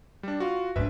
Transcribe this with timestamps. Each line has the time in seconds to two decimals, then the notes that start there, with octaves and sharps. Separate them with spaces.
0.23 G3 D4
0.40 F4 F#4
0.76 A#1 G#2 D4 B4 E5